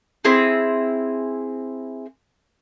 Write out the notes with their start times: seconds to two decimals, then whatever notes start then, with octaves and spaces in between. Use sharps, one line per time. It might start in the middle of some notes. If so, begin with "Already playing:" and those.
0.25 C4 E4 G#4